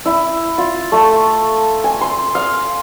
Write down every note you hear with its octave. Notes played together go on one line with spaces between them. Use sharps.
E4
F4
A3
G#5
C6
F5